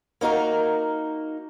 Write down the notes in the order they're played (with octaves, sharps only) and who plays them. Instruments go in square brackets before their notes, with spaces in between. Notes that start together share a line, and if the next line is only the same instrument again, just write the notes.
[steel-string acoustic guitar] A#3 D#4 F#4 A#4